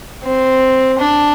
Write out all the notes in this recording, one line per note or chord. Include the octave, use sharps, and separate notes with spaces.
C4
D4